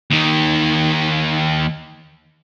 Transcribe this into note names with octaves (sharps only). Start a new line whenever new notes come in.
D#2 D#3